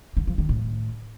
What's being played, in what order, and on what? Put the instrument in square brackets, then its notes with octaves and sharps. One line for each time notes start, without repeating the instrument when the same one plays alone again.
[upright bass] D3
F3
D#3
A2